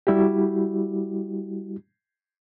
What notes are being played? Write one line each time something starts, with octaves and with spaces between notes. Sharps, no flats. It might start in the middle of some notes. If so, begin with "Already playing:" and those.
G3 E4 F#4 G4